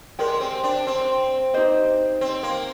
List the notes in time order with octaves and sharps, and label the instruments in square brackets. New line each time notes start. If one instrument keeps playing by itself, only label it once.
[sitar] G#3 [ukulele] G4 A#4 D5 G5
[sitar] C4
D4
C4
[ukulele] D#4 G4 C5 D#5
[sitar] C4
A#3